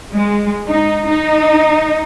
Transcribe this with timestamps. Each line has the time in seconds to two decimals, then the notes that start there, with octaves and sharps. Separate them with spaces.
0.15 G#3
0.68 D#4
1.07 D#4